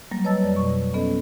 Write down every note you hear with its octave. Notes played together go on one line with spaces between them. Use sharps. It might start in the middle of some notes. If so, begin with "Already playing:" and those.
F#3 G3 A#3
B4 C#5 D#5 A5 E6 A6
F2 D5
F2 B2 C#6
B3 C#4 A4 D#5